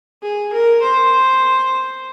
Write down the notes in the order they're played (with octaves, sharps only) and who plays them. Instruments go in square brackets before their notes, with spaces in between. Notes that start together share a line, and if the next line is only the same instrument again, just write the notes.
[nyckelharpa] G#4
A#4
C5